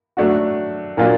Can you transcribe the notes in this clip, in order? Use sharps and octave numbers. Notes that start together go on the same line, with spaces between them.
F#3 A3 D4 F#4
A#2 F#3 A#3 D4 F4